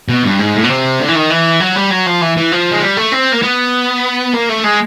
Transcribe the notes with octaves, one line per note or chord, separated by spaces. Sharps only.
B2
G2
G#2
A2
B2
C3
D3
E3
D#3
E3
F#3
G3
F#3
F3
E3
E3
F3
G#3
G3
A3
C4
A#3
B3
A#3
A3
G#3